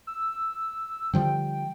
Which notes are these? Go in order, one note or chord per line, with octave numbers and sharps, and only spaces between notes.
E6
D3 F3 G3 G5